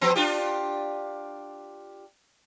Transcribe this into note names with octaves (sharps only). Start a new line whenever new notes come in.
F3 B3 C4
D4 F4 G4